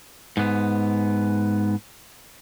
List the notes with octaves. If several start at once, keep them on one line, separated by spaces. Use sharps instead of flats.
G#2 B3